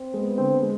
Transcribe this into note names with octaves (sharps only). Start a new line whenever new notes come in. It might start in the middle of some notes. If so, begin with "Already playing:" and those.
Already playing: C4
G#3 B3
B3
D3 C4
B3
G#3